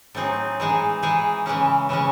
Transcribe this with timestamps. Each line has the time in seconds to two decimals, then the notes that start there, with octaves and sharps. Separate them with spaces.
0.15 A2 F#3 C4 D#4 G#4
0.60 E3 G#3 D#4 G#4
1.02 E3 G#3 D#4 G#4
1.46 C#3 E3 G#3 C#4
1.89 C#3 E3 G#3 C#4